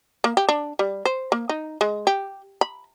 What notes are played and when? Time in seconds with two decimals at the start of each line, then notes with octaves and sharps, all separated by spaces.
0.24 A#3
0.37 G4
0.49 D4
0.79 G3
1.05 C5
1.32 A#3
1.49 D#4
1.81 G#3
2.07 G4
2.61 B5